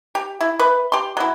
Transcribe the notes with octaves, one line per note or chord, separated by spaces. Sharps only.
G4
E4
B4
G4 C6
F#3 E4